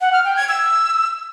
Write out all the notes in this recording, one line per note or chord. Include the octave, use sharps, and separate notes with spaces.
F#5
F6
G5
G#6
E6